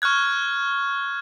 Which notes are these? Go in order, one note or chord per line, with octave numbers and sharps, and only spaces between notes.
C#6 F6 F#6 G#6